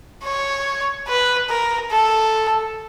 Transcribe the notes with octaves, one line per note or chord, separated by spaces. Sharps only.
C#5
B4
A#4
A4